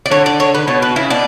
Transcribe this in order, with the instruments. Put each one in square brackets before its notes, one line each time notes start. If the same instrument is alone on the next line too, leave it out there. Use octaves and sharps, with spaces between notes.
[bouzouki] D5
[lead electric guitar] D3 [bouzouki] C#5
[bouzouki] D5
C#5
B4
[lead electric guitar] B2 [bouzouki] C#5
[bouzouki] B4
[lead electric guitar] C#3 [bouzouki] E4
[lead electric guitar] B2 [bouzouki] D4